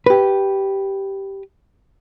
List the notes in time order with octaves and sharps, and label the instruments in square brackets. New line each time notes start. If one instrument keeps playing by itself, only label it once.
[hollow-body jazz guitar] G4 B4